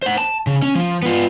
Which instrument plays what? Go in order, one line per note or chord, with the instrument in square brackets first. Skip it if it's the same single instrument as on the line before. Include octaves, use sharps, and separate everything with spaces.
[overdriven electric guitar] C5 F#5
A5
C#3
C#4
F3
B3 F4